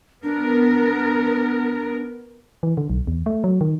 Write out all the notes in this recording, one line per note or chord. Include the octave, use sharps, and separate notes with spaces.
B3 D4 A#4
E3
D3
B1
E2
A3
F#3
D#3